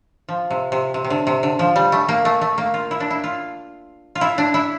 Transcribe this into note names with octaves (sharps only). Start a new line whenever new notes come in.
F3
C3
C3
C3
C3
D3
C3
D3
F3
G3
A3
A#3
A3
A3
A#3
F4
E4
D4
E4
F4
F4
E4
D4
E4